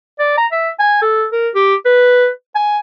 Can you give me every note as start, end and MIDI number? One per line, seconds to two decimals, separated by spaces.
0.19 0.33 74
0.37 0.47 82
0.52 0.69 76
0.79 0.98 80
1.02 1.26 69
1.32 1.49 70
1.55 1.75 67
1.85 2.29 71
2.55 2.79 80